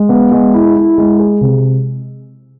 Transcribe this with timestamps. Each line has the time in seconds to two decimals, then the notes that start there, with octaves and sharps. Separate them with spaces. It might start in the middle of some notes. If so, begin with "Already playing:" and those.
Already playing: G#3
0.09 B3
0.31 G#3
0.54 E4
0.76 E4
0.98 G#3
1.19 G#4
1.41 C3